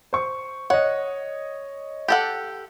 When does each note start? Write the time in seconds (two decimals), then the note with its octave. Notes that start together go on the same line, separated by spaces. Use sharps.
0.13 C5 C#6
0.70 C#5 D#5 F#5
2.08 G4 A4 F#5